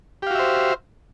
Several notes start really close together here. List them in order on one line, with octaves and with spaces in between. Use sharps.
G4 F5 F#4 E5 C5